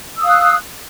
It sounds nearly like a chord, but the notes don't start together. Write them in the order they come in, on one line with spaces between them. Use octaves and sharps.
E6 D#6 F5 F#6